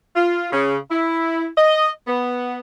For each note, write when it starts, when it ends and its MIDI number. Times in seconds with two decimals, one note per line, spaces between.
0.15 0.48 65
0.52 0.76 49
0.90 1.46 64
1.56 1.88 75
2.07 2.59 59